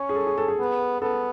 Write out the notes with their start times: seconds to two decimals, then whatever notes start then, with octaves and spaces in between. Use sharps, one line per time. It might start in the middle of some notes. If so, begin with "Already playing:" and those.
Already playing: C#4 C#5
0.09 G#4
0.15 A4
0.27 G#4
0.38 A4
0.48 G#4
0.59 B3
1.02 B3 A4